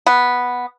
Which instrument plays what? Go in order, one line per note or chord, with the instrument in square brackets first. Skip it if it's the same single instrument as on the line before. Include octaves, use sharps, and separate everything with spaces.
[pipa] B3